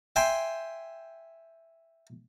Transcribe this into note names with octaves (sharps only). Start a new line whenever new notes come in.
E5 G5 G#5 C6